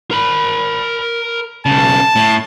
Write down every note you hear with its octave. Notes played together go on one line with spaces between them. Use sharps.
A#4 B5
B1 C#3 A5
A2